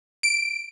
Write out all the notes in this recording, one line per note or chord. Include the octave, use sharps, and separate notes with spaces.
D7